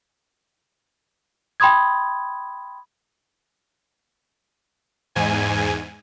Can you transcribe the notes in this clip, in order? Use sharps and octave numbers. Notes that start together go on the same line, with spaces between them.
G5 B5 C6 D#6 G#6
E2 G#2 G#5